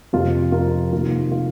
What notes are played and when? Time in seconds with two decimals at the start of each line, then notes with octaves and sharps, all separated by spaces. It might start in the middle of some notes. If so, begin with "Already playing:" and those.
0.13 F2 C3 F3 F4
0.52 F4 A#4
0.93 C3 D#3 A#3 F4
1.32 F4